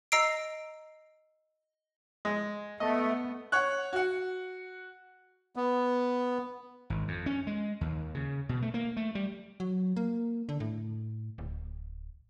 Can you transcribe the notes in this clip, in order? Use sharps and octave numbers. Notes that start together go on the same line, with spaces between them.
D#5 A#5 E6 C7 D7
G#3
A3 B3 D#5
C#5 F#5 C#6 F#6
F#4 F#5
B3
G#1
F2
C#4
G#3
D#2
C#3
B2
A3
A#3
A3
G3
F#3
A#3
D3
A2
D1